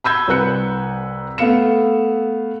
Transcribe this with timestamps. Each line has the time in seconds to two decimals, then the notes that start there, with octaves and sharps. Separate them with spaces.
0.04 B5 E6 G6 G#6
0.28 C2 C4 B4 F#6 C#7
1.38 A3 B3 F5 C#7 E7